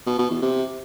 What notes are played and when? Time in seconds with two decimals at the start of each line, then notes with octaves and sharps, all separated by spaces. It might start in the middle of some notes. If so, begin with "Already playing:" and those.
0.06 B2
0.18 B2
0.30 E2
0.42 C3